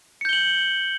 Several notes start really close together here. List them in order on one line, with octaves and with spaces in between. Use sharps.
C#7 G6 G7 F#7